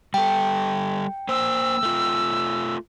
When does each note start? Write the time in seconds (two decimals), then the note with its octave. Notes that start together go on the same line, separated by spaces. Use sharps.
0.14 G3 A4 G5
1.29 A#3 C5 E6
1.83 A3 F4